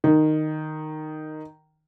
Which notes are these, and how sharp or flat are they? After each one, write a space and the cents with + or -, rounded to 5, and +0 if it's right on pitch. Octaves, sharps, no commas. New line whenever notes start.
D#3 -10